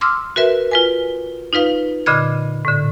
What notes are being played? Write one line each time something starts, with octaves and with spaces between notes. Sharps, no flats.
C6 D6 E6 F6
F#4 A#4 B4 E5
F4 B4 G#5
D#4 F4 B4 F5
A#2 D3 D#5 B5 F6 G#6
A2 D3